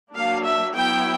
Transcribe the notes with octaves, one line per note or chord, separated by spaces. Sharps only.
F#3 A#3 D4 F5
E5
F#3 B3 E4 G5